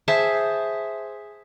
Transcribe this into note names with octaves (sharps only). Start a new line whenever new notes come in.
G#4 C5 E5 A5